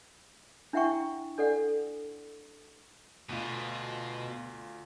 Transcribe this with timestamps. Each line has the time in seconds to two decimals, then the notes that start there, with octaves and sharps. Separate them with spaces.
0.73 D4 E4 E5 F#5 G5 C#6
1.38 D4 A4 D5 F#5
3.29 D2 B2 F4